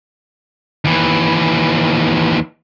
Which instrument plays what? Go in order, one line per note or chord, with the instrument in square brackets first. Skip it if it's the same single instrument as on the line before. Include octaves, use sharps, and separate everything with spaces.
[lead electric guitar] D#2 E3